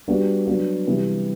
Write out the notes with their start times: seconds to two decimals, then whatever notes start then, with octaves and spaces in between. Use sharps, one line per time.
0.08 G3 B3 D4 F#4
0.47 F#3 B3 D4 F#4
0.87 C3 E3 G3 B3 E4